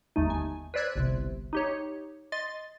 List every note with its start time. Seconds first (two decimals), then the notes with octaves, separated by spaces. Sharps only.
0.16 G1 D#2 A3 D#4
0.30 G#5
0.74 B4 C5 D5 E6 F#6 G#6
0.96 G1 C2 C3
1.53 D#4 G4 C#5
2.32 D#5 C6 A6